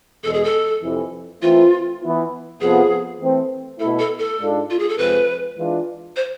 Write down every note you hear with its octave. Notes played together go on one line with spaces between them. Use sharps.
E2 B2 G#3 A4
G#4
A4
F2 C3 E3
E3 A3 C4 E4 F4
E3 B3 E4
F2 C3 F3 B3 G#4
E3 A3 C4
B2 A3 E4 A4
A4
A4
G#2 G#3 D4 F4
F4
G#4
A4
F2 C3 G#3 C4 F4 B4
E3 G#3 D4 F4
C5